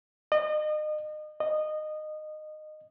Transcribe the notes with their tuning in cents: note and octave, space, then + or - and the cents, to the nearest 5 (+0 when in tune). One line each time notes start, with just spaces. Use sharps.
D#5 -35
D#5 -20